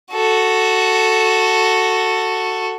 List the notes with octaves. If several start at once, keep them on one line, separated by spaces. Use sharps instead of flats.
F#4 A4